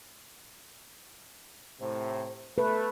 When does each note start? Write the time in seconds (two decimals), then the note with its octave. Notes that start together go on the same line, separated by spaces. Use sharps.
1.81 A2 C3 C5
2.58 A3 A4 B4